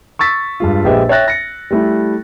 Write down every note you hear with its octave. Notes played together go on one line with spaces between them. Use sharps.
C#6 E6 A6 B6
G2 G#3 F4
A#1 G#3 G4 B4 D#5 E5
C#5 E5 G5 F#6 A6 A#6
A#6 C#7
G3 A3 E4